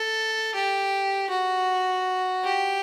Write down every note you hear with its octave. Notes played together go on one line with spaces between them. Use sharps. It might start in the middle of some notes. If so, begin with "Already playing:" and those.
Already playing: A4
G4
F#4
G4